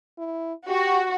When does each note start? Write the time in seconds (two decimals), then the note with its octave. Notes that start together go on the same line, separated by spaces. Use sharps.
0.18 E4
0.69 F#4 G4